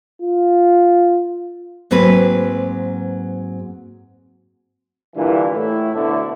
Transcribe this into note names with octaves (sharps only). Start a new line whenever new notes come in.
F4
G#2 F#3 A#3 C4 B4
G2 A#2 D3 E3
A2 E4
D2 B2 D3 A3 D4 E4